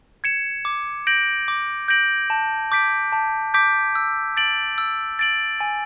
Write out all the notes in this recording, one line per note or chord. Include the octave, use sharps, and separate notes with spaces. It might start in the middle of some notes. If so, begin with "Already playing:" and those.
G#6 C#7 E7
D6
G6 A#6 D7 F#7
D6
G6 A#6 D7 F#7
A5
D6 G6 B6 D7
A5
D6 G6 B6 D7
E6
A6 D7 F#7
E6
A6 D7 F#7
G#5